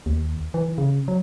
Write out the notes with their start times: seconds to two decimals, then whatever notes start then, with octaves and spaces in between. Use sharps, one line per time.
0.06 D#2
0.54 E3
0.78 C#3
1.08 F#3